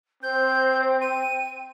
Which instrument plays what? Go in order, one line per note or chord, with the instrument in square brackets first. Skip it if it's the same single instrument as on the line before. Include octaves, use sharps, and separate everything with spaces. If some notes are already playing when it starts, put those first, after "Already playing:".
[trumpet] C4 [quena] C5 [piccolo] G6
[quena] G5 [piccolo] D#7